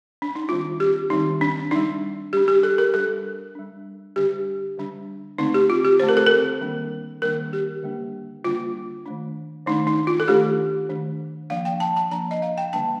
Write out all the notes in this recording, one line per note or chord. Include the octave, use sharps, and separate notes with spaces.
D4
D#4
D#3 G3 C4 F4
G4
D#3 G3 C4 D#4
D4
G3 D4 D#4
G3 D4 G4
G4
A4
A#4
G3 D4 A4
G3 D4
D3 G3 D4 G4
D3 G3 D4
D3 A3 C4 D#4
G4
F4
G4
D3 A3 C4 C5
A#4
A4
A#4
D#3 G3 A#3 D4
D#3 G3 A#3 D4 A#4
G4
D3 G3 A#3 D4
D3 G3 A#3 D4 F4
D#3 A3 D4
D#3 A3 D4 D#4
D#4
F4
A4
D#3 A3 D4 G4
D#3 A3 D4
F3 A#3 D4 F5
G5
A5
A5
F3 A#3 D4 A#5
D#5
F5
G5
D3 G3 A#3 D4 A5